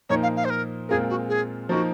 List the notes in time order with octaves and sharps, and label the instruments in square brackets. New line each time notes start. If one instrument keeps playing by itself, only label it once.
[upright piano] A#2 F3 A#3 D#4 [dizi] C#5
[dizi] F5
F5
C5
A#4
[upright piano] A#2 G#3 C4 F4 A#4 [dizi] G#4
[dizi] F#4
G#4
[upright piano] F3 A#3 D#4 A#4 [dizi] F#4